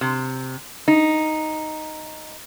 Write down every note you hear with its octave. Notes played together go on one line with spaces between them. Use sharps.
C3
D#4